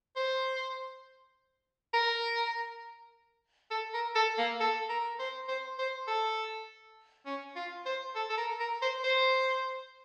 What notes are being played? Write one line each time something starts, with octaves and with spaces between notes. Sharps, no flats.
C5
A#4
A4
A#4
A4
A#3
A4
A#4
C5
C5
C5
A4
C#4
F4
C5
A4
A4
A#4
A#4
C5
C5